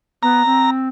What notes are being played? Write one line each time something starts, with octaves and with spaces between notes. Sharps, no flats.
B3 A#5
C4